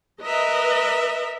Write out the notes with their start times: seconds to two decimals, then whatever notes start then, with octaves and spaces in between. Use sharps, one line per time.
0.22 A#4 B4 D#5 E5